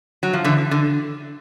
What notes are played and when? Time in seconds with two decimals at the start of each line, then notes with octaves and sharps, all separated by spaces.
0.23 F#3
0.33 F3
0.44 D3 E3
0.71 D3